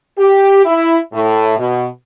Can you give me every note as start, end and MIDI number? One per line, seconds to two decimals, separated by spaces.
0.19 0.63 67
0.66 0.97 64
1.14 1.58 45
1.59 1.86 47